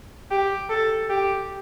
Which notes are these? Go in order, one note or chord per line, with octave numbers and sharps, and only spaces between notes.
G4
A4
G4